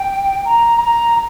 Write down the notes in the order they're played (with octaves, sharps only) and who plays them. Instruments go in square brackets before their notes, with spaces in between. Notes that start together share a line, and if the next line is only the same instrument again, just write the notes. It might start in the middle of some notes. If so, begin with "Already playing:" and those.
Already playing: [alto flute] G5
A#5
A#5